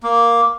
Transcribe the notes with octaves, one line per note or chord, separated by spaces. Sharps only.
A#3